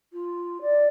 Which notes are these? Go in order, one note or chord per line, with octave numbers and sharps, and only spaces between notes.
F4
D5